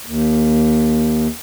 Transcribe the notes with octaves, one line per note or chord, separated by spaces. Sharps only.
D#2